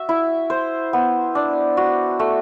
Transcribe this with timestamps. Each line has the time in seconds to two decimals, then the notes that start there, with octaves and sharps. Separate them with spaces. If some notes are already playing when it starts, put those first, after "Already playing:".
Already playing: F#4 E5
0.09 E4
0.50 C5
0.93 B3
1.35 D4
1.77 F#4
2.20 A3